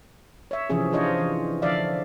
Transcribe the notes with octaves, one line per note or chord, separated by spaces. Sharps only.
C#5 E5
C3 E3 F3 C#4 G#4
D4 F4 C5 C#5 D#5
E3
D3 F3 D4 D5 E5 F5